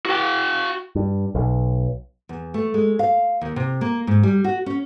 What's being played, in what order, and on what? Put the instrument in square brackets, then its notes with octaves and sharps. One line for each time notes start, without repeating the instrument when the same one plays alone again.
[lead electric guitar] F#4 G5
[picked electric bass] G2
B1
[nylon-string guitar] E2
A3
G#3
F5
D#2
C3
A#3
G#2
G3
F#4
C#4